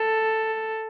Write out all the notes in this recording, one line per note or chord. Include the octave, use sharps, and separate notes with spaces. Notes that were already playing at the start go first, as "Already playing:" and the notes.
Already playing: A4